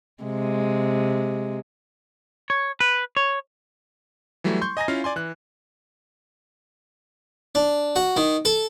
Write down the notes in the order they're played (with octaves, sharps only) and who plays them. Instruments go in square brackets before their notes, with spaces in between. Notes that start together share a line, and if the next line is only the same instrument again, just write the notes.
[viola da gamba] C3 G#3
[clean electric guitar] C#5
B4
C#5
[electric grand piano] E3 F#3 G3 A3 E4
C6 C#6 G6
D#5 G#5 A#5 A#6
C#4 E4 F4 F5
D5 G#5 C6
E3 F#6
[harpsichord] D4
F#4
D#3
A4